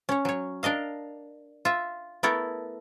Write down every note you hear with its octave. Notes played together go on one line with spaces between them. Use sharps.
C#4 C#5
F#3 C#5
D4 A#4 D#5 F5
F4 E5
A3 B3 E4 A4 A#4